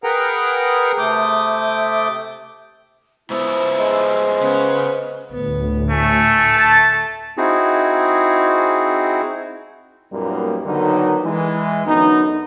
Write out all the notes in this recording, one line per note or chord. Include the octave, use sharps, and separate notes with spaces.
G#4 A#4 B4 F#5 G5 A#5
C3 A3 D6 D#6 G6
G#2 B3 E4 C5
G#3
C#3 B3
D2 A2 B3
A3 G#5
A5
C4 D#4 E4 F#4 G#4
F#2 A#2 G3 A#3 B3 D#4
D3 D#3 F#3 A#3 B3 D#4
E3 G#3
F#2 D3 B3 D#4